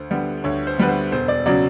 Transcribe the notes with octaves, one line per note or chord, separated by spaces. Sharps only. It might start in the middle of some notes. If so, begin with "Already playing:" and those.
Already playing: D2 C5
D3 G3 B3
D2 C#5
C5
D3 G3 B3 B4
C5
E1 C5
D5
C#3 F#3 D5